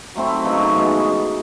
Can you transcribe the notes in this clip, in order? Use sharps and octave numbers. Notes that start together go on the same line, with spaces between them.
F#3 A3 C4 E4
C#3 F#3 B3 D#4
E3 G#3 B3